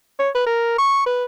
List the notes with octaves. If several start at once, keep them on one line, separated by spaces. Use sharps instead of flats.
C#5
B4
A#4
C#6
B4